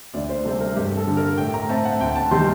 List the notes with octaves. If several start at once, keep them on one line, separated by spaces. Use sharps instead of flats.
D2 D5
C5
C3 G3 C4 A4
A#4
G2 G4
A4
D3 G3
A#4
A2 G5
A#5
A3 C4 A5
F#5
D2 G5
A5
C3 D#3 G3 C6